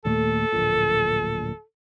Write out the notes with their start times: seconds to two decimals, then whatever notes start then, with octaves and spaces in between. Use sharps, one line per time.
0.05 D#2 A#2 A3 A4
0.52 D1 A#1 A#2